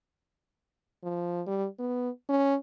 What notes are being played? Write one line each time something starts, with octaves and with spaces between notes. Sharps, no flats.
F3
G3
B3
C#4